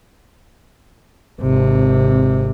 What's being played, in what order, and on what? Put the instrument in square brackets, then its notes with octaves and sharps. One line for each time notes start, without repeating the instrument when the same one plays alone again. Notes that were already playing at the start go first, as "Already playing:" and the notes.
[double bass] G#1 C3